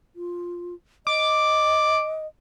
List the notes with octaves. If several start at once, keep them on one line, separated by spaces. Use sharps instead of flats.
F4
D#5 D6